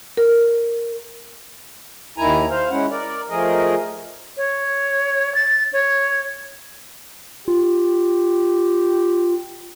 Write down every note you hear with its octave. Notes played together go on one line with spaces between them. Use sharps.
A#4
D#2 D#3 E4 G#5 A#5
C5 F5
G#3 C#4 E4 F#5
A#4 D5
F3 A3 G#4 A#4 D#5
C#5
A6
C#5
F4 G4